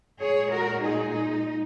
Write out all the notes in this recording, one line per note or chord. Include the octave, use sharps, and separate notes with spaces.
A#2 G#3 G#4 C#5
F#4 A#4
D#4 G#4
D#4